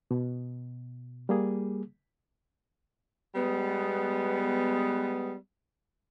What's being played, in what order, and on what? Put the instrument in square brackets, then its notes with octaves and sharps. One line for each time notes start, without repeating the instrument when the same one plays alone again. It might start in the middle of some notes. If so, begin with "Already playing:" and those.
[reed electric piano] B2
G3 A#3 G#4
[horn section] G3 G#3 B3